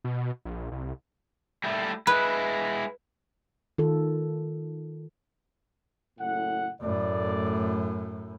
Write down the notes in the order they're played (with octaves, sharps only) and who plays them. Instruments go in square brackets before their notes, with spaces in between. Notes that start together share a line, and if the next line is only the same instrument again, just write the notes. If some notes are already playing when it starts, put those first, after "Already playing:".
[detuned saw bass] B2
A#1
C2
[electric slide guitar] G3 A3 E4
[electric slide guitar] G#3 E4 [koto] B4
[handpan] D#3 F4 A4
[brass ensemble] F#1 A2 F#5
[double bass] F#2 A2 [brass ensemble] A3 D5